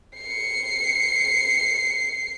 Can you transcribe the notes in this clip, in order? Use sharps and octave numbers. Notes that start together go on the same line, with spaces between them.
C7 C#7